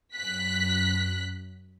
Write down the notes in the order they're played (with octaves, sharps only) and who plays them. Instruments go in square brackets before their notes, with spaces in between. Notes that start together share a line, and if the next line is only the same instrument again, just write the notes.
[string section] F#2 F#6 B6